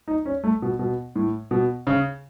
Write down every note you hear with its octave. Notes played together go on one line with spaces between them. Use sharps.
D#4
C#4
A3
B2
B2
A2
B2
C#3